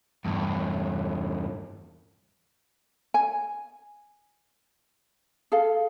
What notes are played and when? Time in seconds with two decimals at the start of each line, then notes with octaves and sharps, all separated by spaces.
0.25 E2 G2
3.14 G#5
5.52 G#4 A4 F5